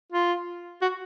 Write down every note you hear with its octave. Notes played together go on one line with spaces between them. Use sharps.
F4
F#4